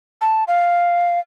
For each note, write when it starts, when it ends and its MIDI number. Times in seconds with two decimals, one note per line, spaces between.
0.21 0.44 81
0.48 1.20 77